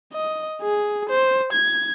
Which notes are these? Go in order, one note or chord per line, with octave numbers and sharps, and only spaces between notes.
D#5
G#4
C5
G#6